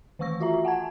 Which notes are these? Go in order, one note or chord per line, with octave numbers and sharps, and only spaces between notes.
D#3 E3 A3 C#6 E6 A#6
F4 F#4 E5 A#5
F#5 G#5 A5 G#6